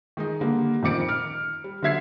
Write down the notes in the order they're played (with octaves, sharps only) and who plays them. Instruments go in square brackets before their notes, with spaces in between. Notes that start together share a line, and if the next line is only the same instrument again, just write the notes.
[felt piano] D#3 G#3 D#4
D3 G3 A#3
D#1 F2 D#3 D6 C#7 D7
F6
G3
D3 F#3 E5 G#6 C7